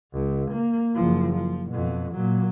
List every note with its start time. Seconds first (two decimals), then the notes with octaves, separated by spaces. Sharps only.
0.13 C#2
0.52 A#3
0.95 F#1 F3
1.35 F3
1.71 F2 B2
2.11 A#2 F#3